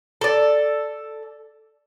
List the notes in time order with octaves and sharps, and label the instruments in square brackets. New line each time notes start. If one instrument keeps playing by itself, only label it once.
[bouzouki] A4 D5